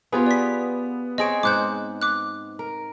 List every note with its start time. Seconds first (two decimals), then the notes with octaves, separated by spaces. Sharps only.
0.12 B3 F4 G4 G#4
0.26 D5 B6
1.18 C4 G#4 C#5 D#5 D7
1.43 G#2 C5 F#5 D6 F#6 G6
2.02 D6 F#6
2.59 A#4